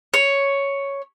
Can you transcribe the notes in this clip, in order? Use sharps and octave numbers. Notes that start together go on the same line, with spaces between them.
C#5